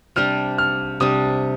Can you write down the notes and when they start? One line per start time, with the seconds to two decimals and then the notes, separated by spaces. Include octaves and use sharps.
0.16 C3 G3 D4 F6
0.58 F6
1.00 C3 G3 D4 D#6